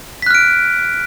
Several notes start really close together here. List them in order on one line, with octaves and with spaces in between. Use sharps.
B6 F#6 F6 D7